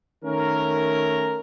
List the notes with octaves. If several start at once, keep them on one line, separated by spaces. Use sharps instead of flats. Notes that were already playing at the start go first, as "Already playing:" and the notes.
D#3 A3 C#4 A#4